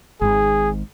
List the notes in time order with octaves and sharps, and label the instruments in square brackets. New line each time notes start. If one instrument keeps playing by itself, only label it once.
[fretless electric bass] G#1 G#2 [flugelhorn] G#4